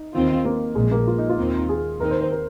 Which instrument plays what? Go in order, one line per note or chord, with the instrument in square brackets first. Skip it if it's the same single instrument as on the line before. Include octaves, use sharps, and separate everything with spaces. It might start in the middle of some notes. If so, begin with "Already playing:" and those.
Already playing: [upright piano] D#4
[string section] D#2 D#3 C4 F4
[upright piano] A#3
[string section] A#1 A#2 F3 [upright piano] G#3
[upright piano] A#3
F4
D#4
F4
[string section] D#2 D#3 C4 D#4
[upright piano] G#4
[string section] D#2 D#3 C4 D#4 [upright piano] A#4
[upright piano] C5
C5
A#4